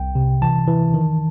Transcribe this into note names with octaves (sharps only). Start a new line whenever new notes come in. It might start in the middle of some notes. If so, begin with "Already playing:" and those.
Already playing: C2 G5
C3
E3 A5
E3
D#3